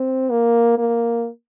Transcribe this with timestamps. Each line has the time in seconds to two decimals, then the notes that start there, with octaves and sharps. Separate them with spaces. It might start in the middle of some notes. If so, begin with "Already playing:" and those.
Already playing: C4
0.30 A#3
0.78 A#3